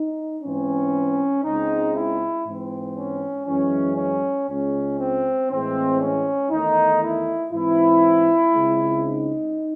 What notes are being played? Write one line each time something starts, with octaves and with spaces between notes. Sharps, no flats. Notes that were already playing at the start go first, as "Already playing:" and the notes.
Already playing: D#4
G#2 E3 C4 C#4
C#2 C#3 G#3 C4 D#4
E4
G#2 E3 C4
C#4
F#2 E3 G#3 C#4
C#4
C#2 C#3 G#3 C#4
C4
A2 E3 G#3 C4
C#4
E2 D#3 A3 D#4
E4
G#2 E3 C4 E4
C#2 C#3 G#3 C4
D#4